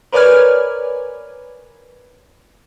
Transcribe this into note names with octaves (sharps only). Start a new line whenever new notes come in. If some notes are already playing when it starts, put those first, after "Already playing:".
A#4 B4 C#5 D5 G#5 F6